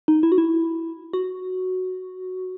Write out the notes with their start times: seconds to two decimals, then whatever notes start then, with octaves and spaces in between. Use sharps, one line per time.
0.08 D#4
0.23 E4
0.32 F#4
0.38 E4
1.13 F#4